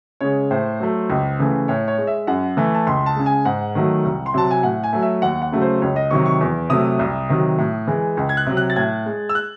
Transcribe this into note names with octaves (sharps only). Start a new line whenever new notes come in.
C#3 G#3 C#5
A2 C5
F#3 A3
C#2
C#3 E3 A3
A2 C#5
C#5
G#3
E5
F#2 F#5
E3 A3
A5
C#2 C6
A5
C#3 G#3
G#5
G#2 F#5
D#3 F#3 A3
C2
C6
C3 F#3 A5
G#5
A2 F#5
G#5
F#3 A3
E5
D#2 F#5
F#5
C#3 F#3 A3
C5
C#2 C#5
D#5
C3 D#3 F#3 C#6
C#6
E2
C3 F#3 A3 D#6
C2
C3 D#3 F#3
A2
E3 G#3
C#2
G#6
F#6
C3 F#3
F#6
A6
A2 G#6
G#3
E6
F#6